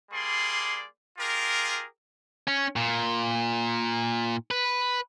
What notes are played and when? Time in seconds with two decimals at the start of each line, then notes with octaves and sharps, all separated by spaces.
0.11 G3 A#3 G#4 D5 C6
1.18 F4 G4 G#4 A#4
2.48 C#4
2.76 A#2
4.51 B4